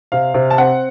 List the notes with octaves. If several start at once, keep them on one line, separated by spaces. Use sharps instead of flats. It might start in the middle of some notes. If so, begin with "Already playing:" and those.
C3 F5
C3
A5
C4 F#5